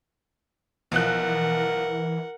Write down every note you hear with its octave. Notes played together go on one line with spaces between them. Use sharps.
B1 E3 F3 A#4 F#5 F#6